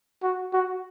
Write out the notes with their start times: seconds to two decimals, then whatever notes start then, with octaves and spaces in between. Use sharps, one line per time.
0.23 F#4
0.53 F#4